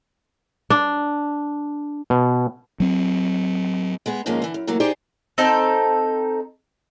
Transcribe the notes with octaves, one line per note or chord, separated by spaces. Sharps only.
D4
B2
F#3 C4
G#3 B3 G#4
G#2 D#3 F3 G#3 A#3 C#4
D3 E3
F#2
E3 F#3 A3 A#3
D#4 G4 G#4 C5 D5
C4 D#4 A4